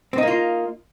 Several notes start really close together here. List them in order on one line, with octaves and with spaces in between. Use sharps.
C4 D#4 A#3 F4